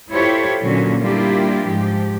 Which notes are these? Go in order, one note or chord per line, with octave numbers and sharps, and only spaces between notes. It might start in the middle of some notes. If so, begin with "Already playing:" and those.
E4 F4 G4 A4 C5 C#5
A#2 D3 F#3 C#4 F#4
G3 A#3 D4 E4 F4 G4
G#2 F3 G4